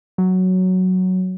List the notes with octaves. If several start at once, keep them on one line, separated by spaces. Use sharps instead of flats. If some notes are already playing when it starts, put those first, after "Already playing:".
F#3